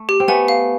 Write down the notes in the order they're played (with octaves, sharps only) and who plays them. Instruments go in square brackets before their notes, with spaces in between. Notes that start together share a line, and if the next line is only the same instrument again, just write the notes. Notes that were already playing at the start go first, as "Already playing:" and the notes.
Already playing: [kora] A3
[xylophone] G4
[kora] C4
[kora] A3 B3 [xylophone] G#5
[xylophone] F5